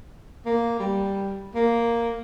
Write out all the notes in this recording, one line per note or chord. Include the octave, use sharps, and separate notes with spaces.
A#3
G3
A#3